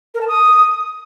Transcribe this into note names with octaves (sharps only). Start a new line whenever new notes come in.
A#4
A5
D#6